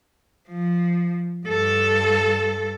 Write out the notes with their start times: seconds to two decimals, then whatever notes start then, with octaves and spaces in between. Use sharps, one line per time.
0.49 F3
1.47 G2 A4